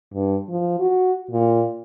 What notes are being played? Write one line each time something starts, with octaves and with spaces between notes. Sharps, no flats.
G2
F3
F#4
A#2